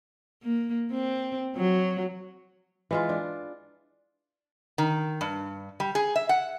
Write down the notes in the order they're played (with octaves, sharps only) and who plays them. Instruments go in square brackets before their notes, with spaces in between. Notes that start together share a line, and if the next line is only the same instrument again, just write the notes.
[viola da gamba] A#3
C4
F#3
[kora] E3 G#3 F4
D4
[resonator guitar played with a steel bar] D#3
G2
G3
G#4
E5
F#5